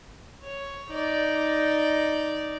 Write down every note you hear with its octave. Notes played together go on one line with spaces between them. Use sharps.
C#5
D#4 D5